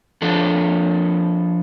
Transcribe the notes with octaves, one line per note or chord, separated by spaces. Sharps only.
F3 D4 A4